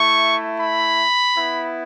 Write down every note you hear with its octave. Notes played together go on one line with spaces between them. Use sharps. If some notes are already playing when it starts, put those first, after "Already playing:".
Already playing: A3 E4 C#6
B5
B3 E4